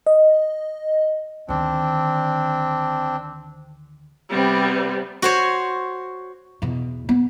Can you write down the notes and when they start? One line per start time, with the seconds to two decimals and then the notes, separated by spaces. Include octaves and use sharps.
0.07 D#5
1.49 D2 D#3 C4 D4
4.31 C3 G3 B3 C4
5.22 F#4 C5 C#5
6.62 E2 B2
7.09 B3